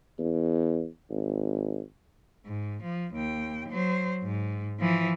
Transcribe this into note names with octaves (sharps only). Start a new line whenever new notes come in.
E2
G#1
G#2
F3
D#2 G5
F#3 C5
G#2
E3 F3